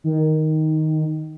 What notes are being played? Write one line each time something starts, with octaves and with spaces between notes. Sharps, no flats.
D#3